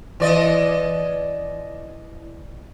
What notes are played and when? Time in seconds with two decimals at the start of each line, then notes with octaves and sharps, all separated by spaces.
0.20 E3 D5 D#5